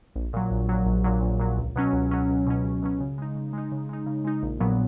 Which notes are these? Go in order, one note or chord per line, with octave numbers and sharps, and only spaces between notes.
A#1
A#2 F#3
A#1
A#2 F#3
A#1
A#2 F#3
A#1
A#2 F#3
C#2
B2 F#3 C#4
C#2
B2 F#3 C#4
C#2
B2 F#3 C#4
C#2
B2 F#3 C#4
C#3
G#3 D#4
C#3
G#3 D#4
C#3
G#3 D#4
C#3
G#3 D#4
A#1
A#2 F#3 B3